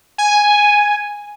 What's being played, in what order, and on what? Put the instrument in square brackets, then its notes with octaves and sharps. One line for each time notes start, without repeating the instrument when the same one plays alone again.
[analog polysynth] G#5